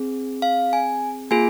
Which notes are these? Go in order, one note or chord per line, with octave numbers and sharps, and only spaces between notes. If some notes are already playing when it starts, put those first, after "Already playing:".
Already playing: C4 G#4
F5
G#5
A#3 F4 G#4 G#5